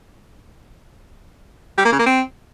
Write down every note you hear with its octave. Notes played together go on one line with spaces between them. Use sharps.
G3
A#3
C#3
A#3
C4